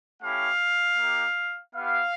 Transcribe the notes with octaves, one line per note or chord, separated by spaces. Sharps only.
A3 C#4 E4 G4 F5
A#3 D#4 G4
B3 E4 G4 F5